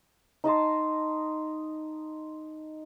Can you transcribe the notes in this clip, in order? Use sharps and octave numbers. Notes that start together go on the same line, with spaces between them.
D#4 D#5 A5 C6